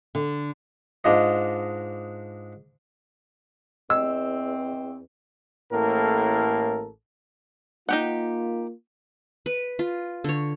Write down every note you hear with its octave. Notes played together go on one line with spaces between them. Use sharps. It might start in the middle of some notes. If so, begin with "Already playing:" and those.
D3
G#2 D4 F4 D#5
E2 C4 D#5 E6
A1 A2 A#3 A4 A#4
A#3 D#4 F4 G4 F#5
B4
F4
D3 C#5